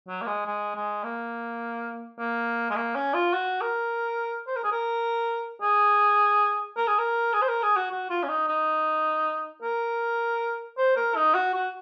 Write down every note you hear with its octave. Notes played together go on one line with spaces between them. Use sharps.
F#3
A#3
G#3
G#3
G#3
A#3
A#3
G#3
A#3
C#4
F4
F#4
A#4
C5
A#4
G#4
A#4
G#4
A#4
G#4
A#4
G#4
C5
A#4
G#4
F#4
F#4
F4
C#4
D#4
D#4
A#4
C5
A#4
D#4
F#4
F#4